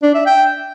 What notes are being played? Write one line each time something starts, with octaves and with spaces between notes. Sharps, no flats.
D4
E5
G5